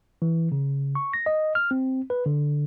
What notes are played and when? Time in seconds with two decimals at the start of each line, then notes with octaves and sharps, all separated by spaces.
0.22 E3
0.52 C#3
0.95 C#6
1.13 A#6
1.26 D#5
1.55 F6
1.71 C4
2.10 B4
2.26 D3